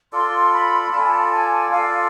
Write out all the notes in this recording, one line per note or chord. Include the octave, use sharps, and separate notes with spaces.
F4 A4 D5 C6
B5
F4 A4 D5 A5
G#5
A5
G#5
F4 A4 D5 F5